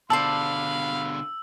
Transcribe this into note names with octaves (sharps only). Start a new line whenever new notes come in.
B2 D3 C5 D5 F5 A5 B5 E6